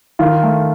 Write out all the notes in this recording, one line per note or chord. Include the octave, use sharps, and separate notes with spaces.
D#3 F4
A3